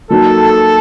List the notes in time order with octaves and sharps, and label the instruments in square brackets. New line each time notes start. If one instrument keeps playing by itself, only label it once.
[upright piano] F#3 A#3 D#4 F#4 [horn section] A4